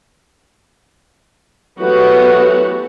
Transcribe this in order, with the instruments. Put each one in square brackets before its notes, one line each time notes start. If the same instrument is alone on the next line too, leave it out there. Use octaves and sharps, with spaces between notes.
[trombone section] E3 F#3 A3 [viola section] B3 F#4 G4